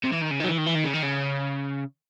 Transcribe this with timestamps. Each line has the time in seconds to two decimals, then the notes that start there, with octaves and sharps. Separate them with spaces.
0.04 C3
0.12 E3
0.22 D#3
0.31 C#3
0.40 D#3 F#3
0.48 E3
0.58 D#3
0.66 E3
0.75 D#3
0.84 C#3
0.93 D#3
1.03 C#3